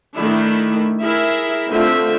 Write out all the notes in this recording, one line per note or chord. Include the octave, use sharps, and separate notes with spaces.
D#3 A3 D4 E4
E4 G#4 A#4 E5
D3 A3 C4 F4 E5